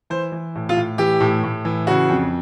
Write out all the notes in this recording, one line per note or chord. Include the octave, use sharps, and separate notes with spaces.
E3 C5
E3
A2
F4
A2
E3 G4
A2
A2
E3
C#3 F#4
F2